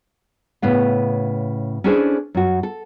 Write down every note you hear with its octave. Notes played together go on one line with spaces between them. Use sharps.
A2 C#3 B3 F5
C#4 D4 E4 G#4 A4 C5
F#2 F#4
A4